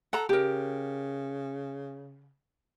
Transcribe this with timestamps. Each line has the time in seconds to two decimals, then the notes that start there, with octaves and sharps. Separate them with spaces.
0.13 A4 F#5 A#5
0.29 C#3 G4 A#4